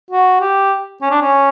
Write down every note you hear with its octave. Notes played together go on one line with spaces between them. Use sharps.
F#4
G4
C#4
D4
C#4